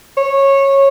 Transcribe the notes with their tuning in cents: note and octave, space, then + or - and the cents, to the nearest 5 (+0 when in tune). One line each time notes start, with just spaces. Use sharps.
C#5 -15